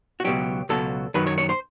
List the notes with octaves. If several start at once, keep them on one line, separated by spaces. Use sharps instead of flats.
F#4
C#2 B2 F#3 G4
C#2 B2 F#3 A4
F#2 D#3 F#3 B4
C#5
C#5
C5